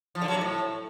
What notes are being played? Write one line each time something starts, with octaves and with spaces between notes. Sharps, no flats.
F3
D3
F#3
C3
A2